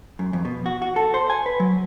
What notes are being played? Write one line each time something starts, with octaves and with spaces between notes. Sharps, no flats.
F#2
F2
B2
F#4
F#4
A4
C5
G#5
B4
F#3